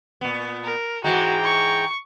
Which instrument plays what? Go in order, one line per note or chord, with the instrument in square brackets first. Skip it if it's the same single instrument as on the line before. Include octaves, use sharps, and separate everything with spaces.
[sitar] A#2 B3
[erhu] A#4
[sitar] G#2 E3 G#3 [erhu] F#4 [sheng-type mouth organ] G5 A#5
[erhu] C#6